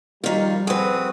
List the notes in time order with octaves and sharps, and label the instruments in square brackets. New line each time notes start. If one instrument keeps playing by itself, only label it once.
[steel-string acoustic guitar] D#3 F4 [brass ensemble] F3 G3 [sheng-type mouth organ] A#3
[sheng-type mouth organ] C4 F#4 D#6 [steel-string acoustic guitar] G#4 B4